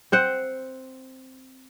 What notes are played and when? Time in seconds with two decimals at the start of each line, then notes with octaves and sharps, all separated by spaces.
0.12 C4 C5 F#5